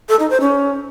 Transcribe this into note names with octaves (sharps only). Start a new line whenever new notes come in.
A4
D#4
C5
C#4